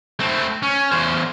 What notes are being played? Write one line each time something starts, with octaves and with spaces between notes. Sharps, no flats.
A3 C4
C#4
E2 C5